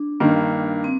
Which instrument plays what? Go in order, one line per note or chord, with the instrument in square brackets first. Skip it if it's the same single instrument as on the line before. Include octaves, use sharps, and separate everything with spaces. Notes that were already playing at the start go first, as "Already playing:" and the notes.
Already playing: [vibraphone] D4
[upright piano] G2 D#3 A#3
[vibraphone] C4